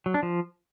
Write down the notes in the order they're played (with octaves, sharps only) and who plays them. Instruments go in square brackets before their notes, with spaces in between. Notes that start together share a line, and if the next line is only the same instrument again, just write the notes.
[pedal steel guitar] F#3
D4
F3